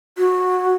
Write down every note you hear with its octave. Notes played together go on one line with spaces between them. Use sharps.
F#4